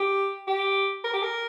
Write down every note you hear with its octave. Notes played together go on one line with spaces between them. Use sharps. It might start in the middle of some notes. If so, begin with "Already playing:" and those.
Already playing: G4
G4
A#4
G4
A#4